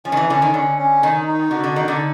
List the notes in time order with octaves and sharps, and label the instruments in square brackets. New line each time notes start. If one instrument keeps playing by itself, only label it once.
[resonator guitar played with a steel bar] F3 [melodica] C#4
[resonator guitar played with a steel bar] D#3
E3
[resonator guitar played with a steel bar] D3 [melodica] C#4
[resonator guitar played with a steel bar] D#3
[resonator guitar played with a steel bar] D3 [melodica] C#4
[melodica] C#4
[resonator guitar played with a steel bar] D#3 [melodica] D#4
[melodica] D#4
[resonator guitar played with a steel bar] D3 [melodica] F#4
[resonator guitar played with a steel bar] D3
[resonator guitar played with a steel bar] D#3 [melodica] D#4
[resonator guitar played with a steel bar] D3